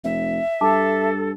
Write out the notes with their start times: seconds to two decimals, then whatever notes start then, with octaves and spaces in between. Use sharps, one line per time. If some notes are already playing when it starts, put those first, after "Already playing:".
0.04 F1 E5
0.61 G2 A4 A5 D6